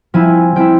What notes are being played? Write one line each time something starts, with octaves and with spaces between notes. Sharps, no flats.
F3 C4 E4 G#5
F3 C4 E4 G5